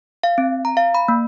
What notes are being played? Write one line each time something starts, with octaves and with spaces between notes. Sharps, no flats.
F5
C4
A#5
F5
B5
A#3